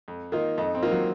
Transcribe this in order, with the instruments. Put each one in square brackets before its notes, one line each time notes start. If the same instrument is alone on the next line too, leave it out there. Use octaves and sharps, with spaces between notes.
[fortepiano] F2
[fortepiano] D#3 A#3 F4 [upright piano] D#4
[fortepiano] F2 [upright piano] D#4
[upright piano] C4
[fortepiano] D#3 A#3 F4
[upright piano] F#3